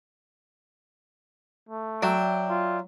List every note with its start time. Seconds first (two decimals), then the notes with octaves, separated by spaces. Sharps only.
1.69 A3
2.02 F#3 D5 E5 G5
2.49 F4